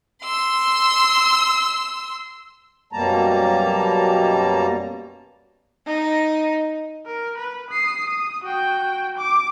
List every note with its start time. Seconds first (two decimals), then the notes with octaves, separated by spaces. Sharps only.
0.23 C6 E6
2.93 F#2 B2 G3 A#3 A5 A#5
5.87 D#4
7.06 A#4
7.38 B4
7.70 D#6 C7
8.06 D#6
8.44 F#4 G5
9.18 D6